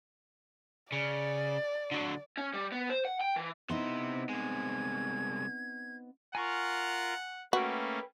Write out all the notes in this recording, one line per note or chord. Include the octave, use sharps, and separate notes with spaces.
C#3 D5
D3 F#3
C#4
G3
B3
C5
F#5
G5
E3
C3 B3 C4 D#4 E4 C6
C2 G#3 G#6
F4 A#4 F#5 G#5 C#6
A3 A#3 C#4 F#4 B4 G5